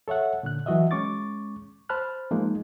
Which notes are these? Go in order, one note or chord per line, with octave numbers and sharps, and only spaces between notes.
A4 C#5 E5 F#5
A#2 D3 F#6
E3 F#3 F#4 D#5 E5
G#3 C#4 C#6 D6 A6
C5 A5 B5 F6 F#6
F3 G#3 A#3 D#4